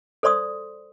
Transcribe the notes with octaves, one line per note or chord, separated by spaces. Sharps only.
A4 C5 D5 C6 D#6